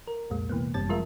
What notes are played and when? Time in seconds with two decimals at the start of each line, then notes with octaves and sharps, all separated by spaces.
0.08 A#4
0.30 C2 F2 A#2 G#3
0.49 C3 E3 A#3 B3
0.74 G1 F#2 G3 C4 A5 A6
0.89 F3 G#3 F4 A#4 E5